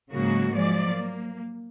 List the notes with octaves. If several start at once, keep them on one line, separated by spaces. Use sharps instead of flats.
G#2 C#3 F#3 G#3 A#3 F#4
F3 F#3 G#3 D5
A#3